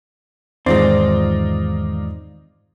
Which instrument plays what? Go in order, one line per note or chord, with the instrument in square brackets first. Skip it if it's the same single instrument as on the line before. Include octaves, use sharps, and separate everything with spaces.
[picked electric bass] E2 G#2 [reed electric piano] D#3 G#3 [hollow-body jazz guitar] C4 [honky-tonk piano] D#4 F4 D5